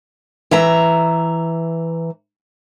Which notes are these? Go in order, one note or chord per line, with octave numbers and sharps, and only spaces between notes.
E3 E5 A#5